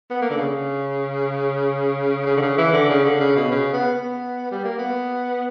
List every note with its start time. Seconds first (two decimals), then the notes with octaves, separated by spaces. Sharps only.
0.10 B3
0.22 A#3
0.30 D3
0.38 C#3
2.26 C#3
2.37 D3
2.42 C#3
2.58 E3
2.73 D3
2.89 C#3
3.05 D3
3.20 C#3
3.36 B2
3.52 C#3
3.73 B3
3.94 B3
4.51 G3
4.64 A#3
4.78 B3